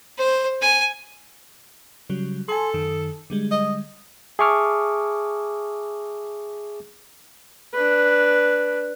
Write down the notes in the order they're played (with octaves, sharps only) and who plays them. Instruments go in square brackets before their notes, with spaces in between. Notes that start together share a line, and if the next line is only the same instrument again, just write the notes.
[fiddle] C5
G#5
[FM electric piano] C#3 F#3 G3
[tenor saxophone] A4 [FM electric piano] G#5 A5 C6
[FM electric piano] F#2 D#3
D3 G3 G#3
[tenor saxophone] D#5
[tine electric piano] G#4 E5 A5 C#6 D6 F6
[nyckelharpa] D4 B4